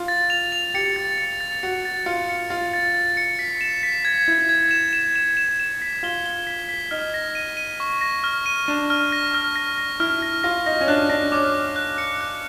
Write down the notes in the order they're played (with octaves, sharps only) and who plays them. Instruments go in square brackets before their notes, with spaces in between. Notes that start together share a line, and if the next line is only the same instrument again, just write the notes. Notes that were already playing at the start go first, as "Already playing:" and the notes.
Already playing: [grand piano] F4
[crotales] A6
F7
F7
[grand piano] G4 [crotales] C#7
[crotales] A6
C#7
A6
[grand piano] F#4 [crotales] C#7
[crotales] A6
[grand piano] F4 [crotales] C#7
[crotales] C#7
[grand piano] F4 [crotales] A6
[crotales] A6
A6
C#7
B6
E7
B6
G#6
[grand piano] E4 [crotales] G#6
[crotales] G#6
E7
E7
E7
E7
E7
B6
[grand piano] F4 [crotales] G7
[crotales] G7
B6
B6
[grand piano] D#4 [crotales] F6
[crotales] A#6
D#7
D#7
C#6
A#6
F6
D#7
[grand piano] D4 [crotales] D#7
[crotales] F6
A#6
F6
A#6
A#6
[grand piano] E4 [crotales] F6
[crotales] A#6
[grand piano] F4 [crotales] A#6
[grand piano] D#4 [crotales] A#6
[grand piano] C#4
[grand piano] D4 [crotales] F#6
[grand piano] D4 [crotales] A#6
[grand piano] C#4 [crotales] D6
[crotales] D6
F#6
C#7
F#6